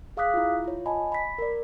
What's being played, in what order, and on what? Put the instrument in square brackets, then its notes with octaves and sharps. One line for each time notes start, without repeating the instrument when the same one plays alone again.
[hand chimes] G#4 F5 D6 D#6 F#6 B6
E4 F4
F4 C#5
D#5 G#5 A5 B5
B5 B6
A#4 D5